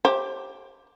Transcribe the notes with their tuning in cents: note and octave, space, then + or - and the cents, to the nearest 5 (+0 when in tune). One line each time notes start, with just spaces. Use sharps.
G4 +0 C5 +35